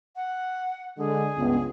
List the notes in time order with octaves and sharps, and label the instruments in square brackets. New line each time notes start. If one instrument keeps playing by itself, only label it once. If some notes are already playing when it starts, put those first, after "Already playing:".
[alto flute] F#5
[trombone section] D3 G#3 [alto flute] G#4
[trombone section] C#2 G2 [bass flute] B3